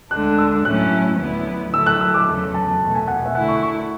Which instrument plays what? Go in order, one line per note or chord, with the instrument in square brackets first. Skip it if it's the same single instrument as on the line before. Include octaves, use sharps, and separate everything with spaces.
[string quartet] D2 D3 G#3 D4 [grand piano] F#6
[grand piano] E6
[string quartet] A2 F#3 A3 C#4 E4 [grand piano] F#6
[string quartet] D2 D3 F#3 B3 E4
[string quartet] D3 F#3 A3 E4 [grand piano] E6
[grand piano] F#6
E6
D6
[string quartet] E2 C#3 F#3 A3
[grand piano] A5
[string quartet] E2 B2 A3
[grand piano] G#5
F#5
E5
[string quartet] D3 A3 E4 [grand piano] F#5
[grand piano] C#6
C#6